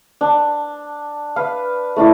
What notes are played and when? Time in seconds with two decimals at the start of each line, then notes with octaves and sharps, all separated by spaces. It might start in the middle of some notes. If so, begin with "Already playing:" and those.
0.21 D4
1.36 B4 F5
1.96 A3 D4 E4 D5